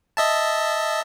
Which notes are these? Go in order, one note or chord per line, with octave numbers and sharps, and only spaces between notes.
D#5 E5 A5